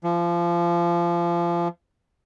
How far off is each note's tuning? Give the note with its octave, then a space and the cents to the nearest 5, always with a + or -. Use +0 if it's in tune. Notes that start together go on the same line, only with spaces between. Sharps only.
F3 -25